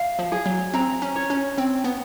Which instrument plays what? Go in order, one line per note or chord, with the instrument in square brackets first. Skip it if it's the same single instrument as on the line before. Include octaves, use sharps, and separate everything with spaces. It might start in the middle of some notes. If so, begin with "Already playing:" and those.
Already playing: [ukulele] F5
[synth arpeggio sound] F3
[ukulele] G#4
[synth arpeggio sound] F#3
[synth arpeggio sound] C4 [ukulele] A#5
[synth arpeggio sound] C#4
[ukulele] C#5
[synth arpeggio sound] C#4
[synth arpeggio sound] C4 [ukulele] G5
[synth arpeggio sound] B3